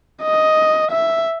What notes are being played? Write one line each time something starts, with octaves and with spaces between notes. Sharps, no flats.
D#5
E5